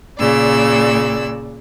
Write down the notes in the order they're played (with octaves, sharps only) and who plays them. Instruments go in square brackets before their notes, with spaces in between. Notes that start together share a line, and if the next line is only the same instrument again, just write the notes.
[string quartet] A#2 C#3 D5 E6